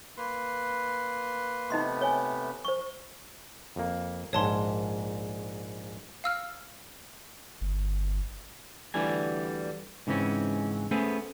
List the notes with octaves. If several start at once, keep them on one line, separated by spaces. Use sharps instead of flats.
A#3 B4 C6
C3 A3 B3 D#4 D#5 C6
C#5 G#5
C5 C#6
F2 A#3
A#1 G#2 C#5 A5 C6
F5 E6 F6
G1
D2 D3 E3 G3 G#5
G#2 C#3 E3 C4 C#4
A3 B3 C#4 G#4 A4 C5